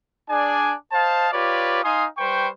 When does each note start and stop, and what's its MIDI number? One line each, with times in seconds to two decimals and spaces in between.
0.30 0.74 62
0.30 0.74 68
0.30 0.74 74
0.30 0.74 80
0.92 1.29 72
0.92 1.29 75
0.92 1.29 77
0.92 1.29 81
1.33 1.82 65
1.33 1.82 67
1.33 1.82 71
1.33 1.82 73
1.33 1.82 74
1.84 2.05 63
1.84 2.05 77
1.84 2.05 80
1.84 2.05 84
1.84 2.05 87
2.18 2.48 55
2.18 2.48 71
2.18 2.48 72
2.18 2.48 79
2.18 2.48 85